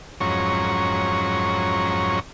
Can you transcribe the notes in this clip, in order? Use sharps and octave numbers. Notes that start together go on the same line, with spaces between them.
F2 G#2 F#3 C#4 C#5 A#5